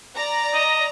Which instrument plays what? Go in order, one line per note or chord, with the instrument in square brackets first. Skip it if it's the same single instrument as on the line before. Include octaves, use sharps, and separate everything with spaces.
[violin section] D5 A#5
[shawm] D#5